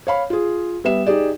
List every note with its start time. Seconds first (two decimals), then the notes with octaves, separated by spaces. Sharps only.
0.07 C#5 F5 B5
0.30 F4 G#4
0.84 G3 B3 E5 E7
1.06 D#4 G4 G#4 D5